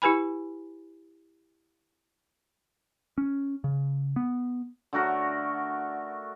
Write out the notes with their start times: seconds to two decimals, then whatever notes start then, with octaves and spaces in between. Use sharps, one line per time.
0.02 E4 G4 B4 G#5 B5
3.18 C#4
3.64 C#3
4.16 B3
4.93 D3 A3 F#4 A#4